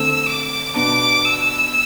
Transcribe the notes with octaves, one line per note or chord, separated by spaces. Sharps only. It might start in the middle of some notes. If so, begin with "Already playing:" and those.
Already playing: D3 A3 C4 E6
D6
B2 B3 D4 D6
E6